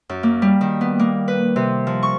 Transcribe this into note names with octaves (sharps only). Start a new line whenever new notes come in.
F#2
A#3
G3
D#3
B3
A#3
B4
C3
F3
C#6